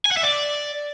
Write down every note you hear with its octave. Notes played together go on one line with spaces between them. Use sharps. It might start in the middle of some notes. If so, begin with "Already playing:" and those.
G#5
F#5
E5
D5